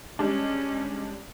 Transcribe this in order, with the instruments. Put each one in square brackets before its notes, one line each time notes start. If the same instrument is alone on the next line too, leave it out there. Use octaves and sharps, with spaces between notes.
[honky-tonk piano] G3 G#3 D4 [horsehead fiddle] C#4